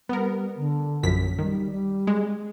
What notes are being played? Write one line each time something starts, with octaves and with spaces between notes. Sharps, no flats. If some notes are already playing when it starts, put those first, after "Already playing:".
G3 B3 A#4
D3
A#1 F#2 B6
D#3 G3
G3
G#3